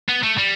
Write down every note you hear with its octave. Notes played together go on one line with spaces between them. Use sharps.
B3
A3
G3